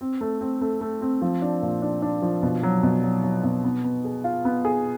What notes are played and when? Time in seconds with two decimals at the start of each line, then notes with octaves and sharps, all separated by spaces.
0.01 C4
0.21 A3
0.41 C4
0.61 A3
0.81 A3
1.01 C4
1.22 F3
1.42 D4
1.62 A#2
1.82 D4
2.02 D4
2.22 F3
2.43 B2
2.63 F#3
2.83 B2
3.03 F#3
3.23 F#3
3.44 B2
3.64 B3
3.84 B3
4.04 G#4
4.24 F4
4.45 B3
4.65 G#4